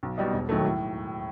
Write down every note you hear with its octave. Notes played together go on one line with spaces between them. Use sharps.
B1
B2 G3 D#4
E1
D#2 D#3 F#3 A3
A2